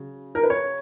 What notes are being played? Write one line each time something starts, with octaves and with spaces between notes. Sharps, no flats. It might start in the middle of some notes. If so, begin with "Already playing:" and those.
Already playing: C#3 F#3
A#4
B4
C#5